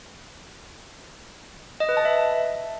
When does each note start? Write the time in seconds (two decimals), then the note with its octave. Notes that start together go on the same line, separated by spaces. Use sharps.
1.80 D#5
1.89 B4
1.97 A5
2.05 E5